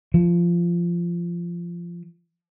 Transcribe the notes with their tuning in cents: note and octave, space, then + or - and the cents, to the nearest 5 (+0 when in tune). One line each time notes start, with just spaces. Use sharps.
F3 -15